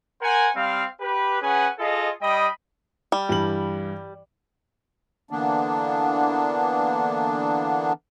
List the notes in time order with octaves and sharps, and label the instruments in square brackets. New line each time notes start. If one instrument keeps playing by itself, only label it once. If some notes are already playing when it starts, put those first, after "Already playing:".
[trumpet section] A#4 C5 F#5 G#5
G3 C4 F5
G4 B4
C#4 G#4 B4 F#5 G#5
F4 G#4 A4 D#5
G3 D#5 G5 B5 D#6
[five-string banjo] G3
[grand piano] G2 E3 F#7
[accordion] D3 E3 A#3 B3 D4